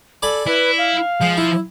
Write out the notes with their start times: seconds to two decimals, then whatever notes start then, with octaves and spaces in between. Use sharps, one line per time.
0.22 A4 D5 G#5 B5
0.47 E4 B4
0.78 F5
1.21 F3 G#3
1.37 E4